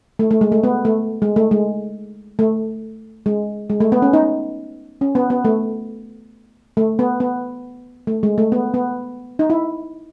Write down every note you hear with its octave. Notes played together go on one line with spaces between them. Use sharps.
A3
A3
G#3
A3
B3
A3
G#3
A3
G#3
A3
G#3
G#3
A3
B3
C#4
D#4
C#4
B3
B3
A3
A3
B3
B3
A3
G#3
A3
B3
B3
D#4
E4